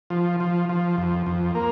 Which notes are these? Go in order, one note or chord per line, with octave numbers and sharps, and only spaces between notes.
F3
F3
F3
F2
F2
A#3